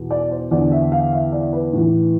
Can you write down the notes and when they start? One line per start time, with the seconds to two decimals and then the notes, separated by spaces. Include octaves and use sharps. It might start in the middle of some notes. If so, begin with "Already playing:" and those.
Already playing: E2 B2
0.11 D5
0.31 C5
0.51 E2 D3 D5
0.72 E5
0.92 F5
1.13 E5
1.32 D5
1.53 B4
1.73 A2 E3